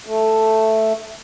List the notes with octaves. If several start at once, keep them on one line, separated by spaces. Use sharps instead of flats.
A3